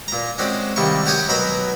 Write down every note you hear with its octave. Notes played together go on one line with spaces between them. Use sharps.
A#2 A#5
G#3 C4 C#4 F#4 D5
C2 D#3 G3 A#3 C#6
F#4 G4 C#5 D#5 G5
B2 F#3 A#4 A#5 B5